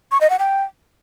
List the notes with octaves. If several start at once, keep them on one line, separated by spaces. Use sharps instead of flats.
C#6
D#5
F#5
G5